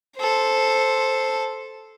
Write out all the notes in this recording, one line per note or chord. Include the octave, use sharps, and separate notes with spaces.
A4 C5